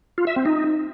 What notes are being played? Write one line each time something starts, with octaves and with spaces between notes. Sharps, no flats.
F4
E5
C4
D#4